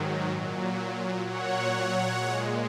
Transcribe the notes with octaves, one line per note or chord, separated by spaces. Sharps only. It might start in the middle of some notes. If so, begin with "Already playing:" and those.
Already playing: G#2 D#3 F#3
A#2 F#3
A#2 F#3 C#5 F#5
A#2 G#3